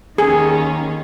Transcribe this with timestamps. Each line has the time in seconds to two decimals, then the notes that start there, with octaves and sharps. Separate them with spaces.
0.18 D#2 D#3 C#4 G#4